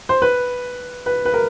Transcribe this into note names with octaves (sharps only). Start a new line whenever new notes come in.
C5
B4
B4
B4
A#4